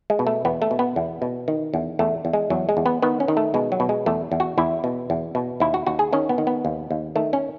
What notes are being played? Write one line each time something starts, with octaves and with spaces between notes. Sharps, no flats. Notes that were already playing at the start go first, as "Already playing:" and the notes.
G#3
B2
A3
E2 B3
A3
B2
B3
E2
B2
D#3
E2
E2 A3
E2
G#3
E2 F#3
G#3
E2
B3
D#3 B3
C#4
D#3
A3
B2 G#3
F#3
B2
G#3
E2 A3
E2
F#4
E2 E4
B2
E2
B2
D#2 E4
F#4
D#2 F#4
G#4
D#3 C#4
B3
D#3
B3
D#2
D#2
D#3 A3
C#4